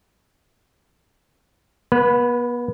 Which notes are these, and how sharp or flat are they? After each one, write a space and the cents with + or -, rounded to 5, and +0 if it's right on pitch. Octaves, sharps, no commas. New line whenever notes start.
B3 -35 B4 +0